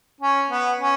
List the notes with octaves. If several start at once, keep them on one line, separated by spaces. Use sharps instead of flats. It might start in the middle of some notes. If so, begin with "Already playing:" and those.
C#4
B3
C#4